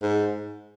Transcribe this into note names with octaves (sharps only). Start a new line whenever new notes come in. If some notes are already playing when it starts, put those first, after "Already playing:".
G#2